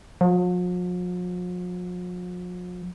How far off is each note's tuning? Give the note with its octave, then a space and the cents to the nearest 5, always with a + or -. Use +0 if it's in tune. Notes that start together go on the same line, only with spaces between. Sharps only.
F3 +45